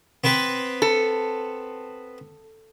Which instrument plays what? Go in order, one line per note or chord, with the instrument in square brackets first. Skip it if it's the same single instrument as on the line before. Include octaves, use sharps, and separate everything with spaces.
[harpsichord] B3 C4 B4
[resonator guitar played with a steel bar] A4